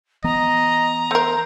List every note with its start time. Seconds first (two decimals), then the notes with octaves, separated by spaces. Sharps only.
0.24 E3 B3 D#5 A#5
1.11 A3 A#4 C5